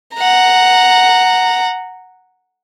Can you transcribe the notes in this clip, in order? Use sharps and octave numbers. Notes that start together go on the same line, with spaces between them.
F#5 A#5